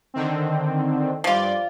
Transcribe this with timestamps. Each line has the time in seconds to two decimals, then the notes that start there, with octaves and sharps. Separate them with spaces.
0.14 D3 D#3 C4
1.24 G2 F3 F4 D5